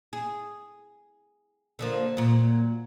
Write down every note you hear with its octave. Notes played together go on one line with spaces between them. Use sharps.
G#4
D3 F3 A#3
A#2 F#3